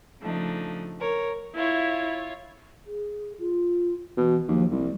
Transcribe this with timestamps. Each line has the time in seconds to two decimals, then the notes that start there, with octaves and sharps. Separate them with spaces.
0.21 C#3 F3 A3 D4 D#4
1.00 A#4 C#5
1.55 E4 F4 C#5
2.86 G#4
3.40 F4
4.17 B2 E3
4.48 D#2 F3
4.71 C2 G3